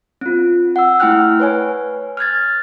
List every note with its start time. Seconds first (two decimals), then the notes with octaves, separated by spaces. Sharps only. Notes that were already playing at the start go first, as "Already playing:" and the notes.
0.21 C4 F4
0.76 F#5 E6
1.00 A3 E4 G5 F6 F#6
1.40 B4 C#5 G#5
2.17 F6 F#6 G#6 A6